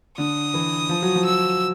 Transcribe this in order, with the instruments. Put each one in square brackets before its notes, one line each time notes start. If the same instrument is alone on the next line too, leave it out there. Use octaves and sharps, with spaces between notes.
[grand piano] D3 [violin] D#6
[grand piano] E3
F3
F#3
F3
[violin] E6